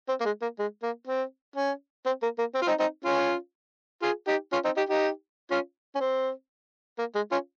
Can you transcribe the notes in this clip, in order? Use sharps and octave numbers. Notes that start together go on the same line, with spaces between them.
C4
A#3
G#3
A#3
G#3
A#3
C4
C#4
C4
A#3
A#3
C4
F4
C4 D#4
C4 D#4
C#4 F4
F4 G#4
D#4 G4
C#4 F4
C4 D#4
D#4 G4
D#4 G4
C#4 F4
C#4
C4
A#3
G#3
C#4 F4